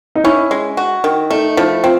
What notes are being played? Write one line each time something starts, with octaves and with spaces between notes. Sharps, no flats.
D#4
C#4 E4
G#3
F#4
D#3
A3 D#4
F3 E4
C4 F4